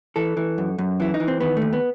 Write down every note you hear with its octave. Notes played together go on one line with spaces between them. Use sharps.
E3 A4
E3
F#2
F#2
E3 E4
D#4
E3
C4
D#3 B3
D#2 A3
B3